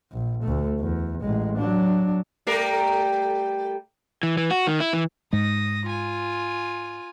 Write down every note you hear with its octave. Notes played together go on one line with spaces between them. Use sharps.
A#1
D2 A3
E2
A1 G#3
F#3 D4
G3 A3 A#4
E3
E3
F#4
D#3
E4
E3
G#2 G#3 D#6 A#6
F4 G#5